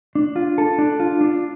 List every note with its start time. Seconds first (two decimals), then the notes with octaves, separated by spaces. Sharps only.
0.15 D4
0.36 F4
0.58 A4
0.79 D4
1.00 F4
1.21 D4